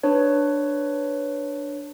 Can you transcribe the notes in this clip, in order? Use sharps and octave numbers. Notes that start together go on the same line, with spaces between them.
D4 B4 C#5